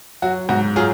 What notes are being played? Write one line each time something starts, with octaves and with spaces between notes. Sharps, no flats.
F#3 F#4
G#2 F#4
F#3 F4 G#4